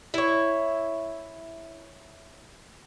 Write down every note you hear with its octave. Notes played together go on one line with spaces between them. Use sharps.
E4 C#5